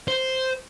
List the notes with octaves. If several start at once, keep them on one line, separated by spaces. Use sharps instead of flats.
C5